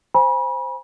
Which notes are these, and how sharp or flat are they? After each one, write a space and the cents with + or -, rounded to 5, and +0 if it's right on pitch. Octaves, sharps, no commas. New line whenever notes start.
C5 +0 G#5 -20 B5 -35